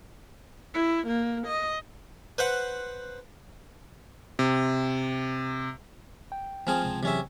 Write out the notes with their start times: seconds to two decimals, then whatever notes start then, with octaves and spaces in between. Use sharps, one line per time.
0.74 E4
1.07 A#3
1.47 D#5
2.38 B4 C5 F#5
4.39 C3
6.32 G5
6.67 F3 C4 G#4 G#5 F6
6.82 C#2 C3 G#3
7.03 C3 E3 F#3 C#4 G#4 E5